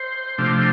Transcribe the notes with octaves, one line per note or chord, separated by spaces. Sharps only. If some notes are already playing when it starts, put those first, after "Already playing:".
Already playing: C5
C3 F3 A3 D4